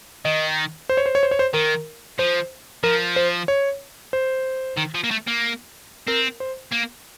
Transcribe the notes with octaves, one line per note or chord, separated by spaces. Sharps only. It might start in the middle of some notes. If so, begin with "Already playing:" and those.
D#3 D#5
C5
C#5
C5
C#5
C5
C#5
C5
D#3 A#4
F3 C5
F3 A#4
C5
C#5
C5
D#3
F3
A#3
A3
A#3
C4 A#4
C5
A#3